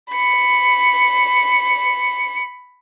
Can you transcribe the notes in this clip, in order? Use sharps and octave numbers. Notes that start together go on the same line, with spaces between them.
B5 C#7